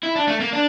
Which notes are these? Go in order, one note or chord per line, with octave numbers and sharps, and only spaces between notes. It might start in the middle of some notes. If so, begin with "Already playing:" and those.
E4
D4
A3
A#3
D4